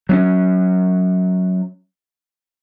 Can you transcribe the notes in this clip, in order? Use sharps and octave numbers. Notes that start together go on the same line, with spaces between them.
F#3 C4 C#4